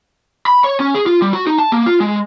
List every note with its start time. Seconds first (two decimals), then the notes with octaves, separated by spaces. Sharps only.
0.47 B5
0.64 C#5
0.80 C#4
0.95 G#4
1.06 F4
1.22 G3
1.33 F#4
1.47 D#4
1.58 A5
1.72 A#3
1.86 F4
2.00 G#3